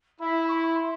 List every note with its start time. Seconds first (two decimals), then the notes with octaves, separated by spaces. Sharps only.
0.20 E4 B5
0.48 C#6
0.51 B5
0.76 C6